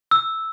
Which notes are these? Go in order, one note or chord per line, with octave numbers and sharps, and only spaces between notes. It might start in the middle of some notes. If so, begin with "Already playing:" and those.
E6